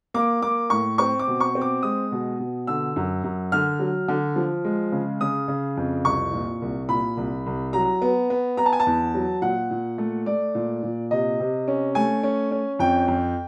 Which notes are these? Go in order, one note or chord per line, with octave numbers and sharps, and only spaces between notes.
A#3 D6
A#3 D6
A2 C#6
C4 C#6
D6
B2
C#6
C4
D6
G#3 D#6
B2
B2
D3 E6
F#2
F#2
D3 F6
F#3
D3
F3
G#3
C#3
C#3 D#6
C#3
F2
C2 C#6
A#2
C2
A#2 B5
C2
C2
F#3 A#5
B3
B3
B3 A#5
A5
G#5
A5
E2
F#3
A#2 F#5
A#2
A3
A3 D5
A#2
A#2
C3 D#5
C3
C#4
A3 G#5
C#4
C#4
F2 G5
F2